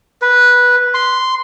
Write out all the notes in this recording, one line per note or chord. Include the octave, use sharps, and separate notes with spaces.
B4
C6